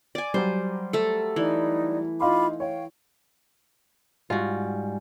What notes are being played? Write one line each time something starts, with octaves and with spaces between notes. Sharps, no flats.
D5 G#5
F#3 G3 C5
A3 A4
E3 D#4 D5
D#4 F4 F5 B5 C6 D6
C#5 F5 G5
G#2 G3 F4 F#4